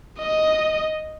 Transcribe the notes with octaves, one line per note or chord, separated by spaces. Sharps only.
D#5